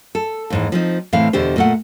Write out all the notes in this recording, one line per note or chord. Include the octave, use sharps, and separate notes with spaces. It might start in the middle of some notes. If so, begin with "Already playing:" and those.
A4
D#2 G#2 E3
F3 C4 D#4
A2 E3 C4 F5
E2 B2 D3 G4 C5
A#2 A3 F#5